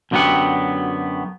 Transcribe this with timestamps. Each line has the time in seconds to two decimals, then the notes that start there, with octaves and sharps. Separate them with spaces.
0.11 F#2 D3 F#3 B3 G4 F#5